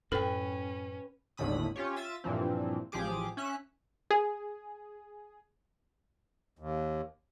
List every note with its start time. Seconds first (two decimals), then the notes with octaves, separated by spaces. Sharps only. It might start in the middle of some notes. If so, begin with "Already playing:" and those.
0.12 F#2 A2 C#4 A4 B4 G5
1.37 G#1 D#2 A2 D3 B5 D#6
1.76 C#4 F4 G4 C#5
1.96 F4 E5 A6 D#7
2.24 G2 A#2 E3 F3 C4
2.92 A1 F3 G4 G#4 D6
3.37 C#4 E5 F#6
4.11 G#4
6.59 D#2